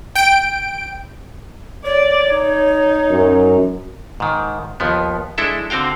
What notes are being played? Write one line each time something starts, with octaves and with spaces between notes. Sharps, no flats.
G5 D7
C#5 D5
D#4
F#2
G#2 D#3
D#2 F3 B3
G#3 D4 E4 A4 E5
D3 C4 F#4 F5 G5